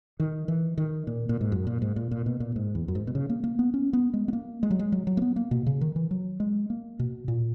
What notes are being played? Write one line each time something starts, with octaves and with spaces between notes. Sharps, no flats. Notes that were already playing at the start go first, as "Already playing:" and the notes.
D#3
E3
D#3
A#2
A#2
G#2
F#2
A#2
G#2
A#2
A#2
B2
A#2
G#2
E2
F#2
G#2
B2
C#3
A#3
A#3
B3
C#4
B3
G#3
B3
A#3
G#3
F#3
G#3
F#3
F#3
A#3
B3
A#3
B2
C#3
D#3
E3
F#3
G#3
A#3
B2
A#2